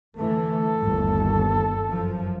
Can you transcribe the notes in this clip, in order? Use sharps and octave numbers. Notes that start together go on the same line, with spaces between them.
D3 E3 A3 A4
G1 D#2
F#2 F3